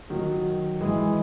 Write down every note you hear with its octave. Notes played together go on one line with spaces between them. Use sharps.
D#3 F#3
E3 G#3